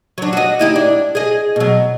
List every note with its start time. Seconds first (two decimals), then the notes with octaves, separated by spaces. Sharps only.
0.18 F#3 D4
0.33 F#4 D#5
0.59 D#4 E4 G4
0.76 D4
1.15 G#4 D#5
1.56 B2 F#3